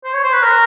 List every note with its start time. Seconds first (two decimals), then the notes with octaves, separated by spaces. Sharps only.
0.04 C5
0.13 C#5
0.23 C5
0.33 B4
0.42 A#4